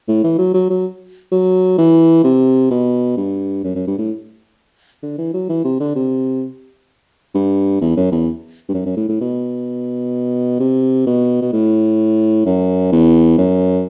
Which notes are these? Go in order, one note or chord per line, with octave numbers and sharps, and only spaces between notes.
A2
E3
F#3
F#3
F#3
F#3
E3
C3
B2
G2
F#2
F#2
G2
A2
D3
E3
F#3
E3
C3
D3
C3
G2
E2
F#2
E2
G2
F#2
F#2
A2
A2
B2
C3
B2
B2
A2
F#2
E2
F#2